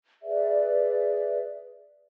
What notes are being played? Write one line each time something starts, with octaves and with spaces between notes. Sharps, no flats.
G#4 B4 D5 E5